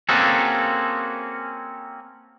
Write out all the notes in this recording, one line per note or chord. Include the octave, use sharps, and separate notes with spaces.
A#3 C4 C#4 F#4 G#4 A4